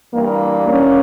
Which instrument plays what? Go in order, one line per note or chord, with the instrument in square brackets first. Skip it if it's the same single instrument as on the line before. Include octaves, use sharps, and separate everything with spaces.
[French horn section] G2 E3 G3 A#3
A#3 C#4